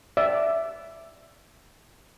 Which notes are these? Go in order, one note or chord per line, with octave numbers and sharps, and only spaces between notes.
D5 E5